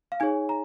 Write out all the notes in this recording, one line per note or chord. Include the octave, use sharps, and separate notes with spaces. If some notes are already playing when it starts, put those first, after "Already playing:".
F5
D#4 G#4 C#5 G#5
A#5